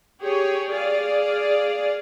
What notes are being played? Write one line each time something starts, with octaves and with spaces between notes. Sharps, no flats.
G4 G#4 C#5
G#4 D5 F5